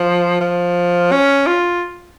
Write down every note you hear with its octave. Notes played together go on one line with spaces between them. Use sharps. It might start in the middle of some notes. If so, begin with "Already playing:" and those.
Already playing: F3
F3
C#4
F4